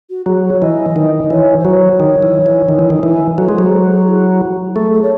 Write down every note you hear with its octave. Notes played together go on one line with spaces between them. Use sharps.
F#4
F#3 G#4
C#5
E3 D#5
D#3
E3 C#5
C5
F#3 C#5
D#3
E3
E3
D#3
E3
D#3
E3
F#3 A4
G#3
F#3 C5
A4
G#4
E4
A3 G#4
A4
C#5